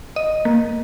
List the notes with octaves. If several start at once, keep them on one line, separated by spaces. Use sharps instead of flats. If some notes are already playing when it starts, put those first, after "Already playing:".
D#5
A#3